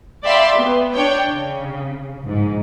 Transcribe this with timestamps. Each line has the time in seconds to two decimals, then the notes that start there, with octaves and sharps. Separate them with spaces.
0.24 D5 E5 F5 G5 B5 C6
0.57 B3
0.94 D4 C#5 G5
1.27 C#3
2.22 A#1 G#2